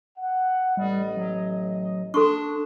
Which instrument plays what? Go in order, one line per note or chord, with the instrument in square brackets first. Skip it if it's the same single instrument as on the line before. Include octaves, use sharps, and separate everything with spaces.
[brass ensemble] F#5
[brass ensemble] A1 D#5 [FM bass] G3
[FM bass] F#3
[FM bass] D4 [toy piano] A4 C6 C#6